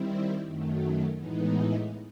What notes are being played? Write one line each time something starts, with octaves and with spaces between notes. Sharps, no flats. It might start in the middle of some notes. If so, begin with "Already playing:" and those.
Already playing: D#3 G3 C4 E4
F#2 D#3 F#3 A3
A2 E3 G#3 B3 D#4